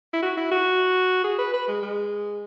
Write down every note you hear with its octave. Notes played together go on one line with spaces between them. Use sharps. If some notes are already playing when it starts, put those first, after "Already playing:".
E4
F#4
E4
F#4
G#4
B4
B4
G#3
G#3